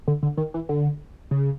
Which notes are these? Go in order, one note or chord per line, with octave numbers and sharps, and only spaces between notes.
D3
D3
D#3
E3
D3
C#3